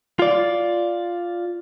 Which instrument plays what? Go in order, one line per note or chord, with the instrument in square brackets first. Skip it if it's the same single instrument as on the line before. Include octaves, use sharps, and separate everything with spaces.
[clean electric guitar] F4 D5